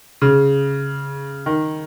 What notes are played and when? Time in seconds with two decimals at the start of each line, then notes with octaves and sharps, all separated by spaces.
0.22 C#3
1.46 D#3